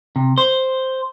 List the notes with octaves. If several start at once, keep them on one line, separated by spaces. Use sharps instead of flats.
C3
C5